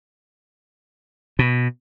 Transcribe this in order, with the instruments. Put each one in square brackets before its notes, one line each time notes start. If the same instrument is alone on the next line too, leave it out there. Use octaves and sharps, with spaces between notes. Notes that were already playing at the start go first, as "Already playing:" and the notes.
[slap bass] B2